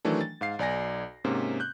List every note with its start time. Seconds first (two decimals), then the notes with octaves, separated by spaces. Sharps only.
0.05 D#3 E3 F#3 A3 D4
0.21 A6
0.41 G#2 F5 C7
0.59 B1 D5 G#5 A#6
1.24 G#2 C3 A#3 C#4
1.60 F#6 G6